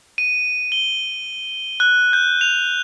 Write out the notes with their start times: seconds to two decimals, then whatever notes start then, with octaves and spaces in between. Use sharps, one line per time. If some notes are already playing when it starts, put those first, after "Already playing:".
0.18 D#7
0.72 G7
1.80 F#6
2.13 G6
2.41 F7